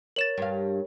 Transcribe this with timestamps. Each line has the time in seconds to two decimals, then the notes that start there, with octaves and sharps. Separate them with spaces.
0.16 A#4 C#5 A6 E7 F#7
0.38 G2 F5